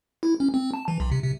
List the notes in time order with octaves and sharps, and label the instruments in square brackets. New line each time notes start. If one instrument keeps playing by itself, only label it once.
[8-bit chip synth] E4
C#4
C4
A5
E3
B1
C3
C3